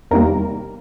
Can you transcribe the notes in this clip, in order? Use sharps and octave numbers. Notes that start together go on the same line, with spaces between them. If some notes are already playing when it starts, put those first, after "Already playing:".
E2 C3 D#3 G3 A#3 A#4